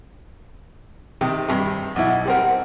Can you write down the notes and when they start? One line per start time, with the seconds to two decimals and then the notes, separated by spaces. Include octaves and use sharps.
1.21 C3 D#3
1.48 G2 C3
1.96 B1 E4 F#5
2.26 G3 C4 A#4